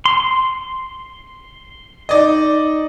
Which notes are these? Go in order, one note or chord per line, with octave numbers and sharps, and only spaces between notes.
C6
D#4 D5 D#5